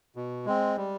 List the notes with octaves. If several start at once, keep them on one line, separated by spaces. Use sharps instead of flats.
B2
G#3 C4
G3